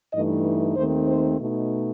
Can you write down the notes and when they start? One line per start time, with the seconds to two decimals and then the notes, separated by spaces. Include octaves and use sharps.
0.13 G2 E3 A3 D#4 D#5
0.76 D#2 D#3 A3 C4 D#4 C5
1.08 C5
1.39 B2 A3 D#4